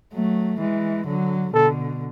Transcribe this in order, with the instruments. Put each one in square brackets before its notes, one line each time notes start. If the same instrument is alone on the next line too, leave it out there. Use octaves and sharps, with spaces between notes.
[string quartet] F#3 A3
E3 G#3
D3 F#3
[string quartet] B2 D3 [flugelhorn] A4